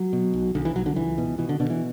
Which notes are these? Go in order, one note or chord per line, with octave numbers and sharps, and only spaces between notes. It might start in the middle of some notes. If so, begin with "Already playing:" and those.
Already playing: F#3
B2
B1
B1 D3
E3
B1 F#3
D3
C#2 E3
B2
B2 E3
D3
B2 D3
E3